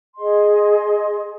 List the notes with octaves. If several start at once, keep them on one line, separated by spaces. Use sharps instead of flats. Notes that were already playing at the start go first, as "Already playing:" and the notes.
G#4 D#5 C6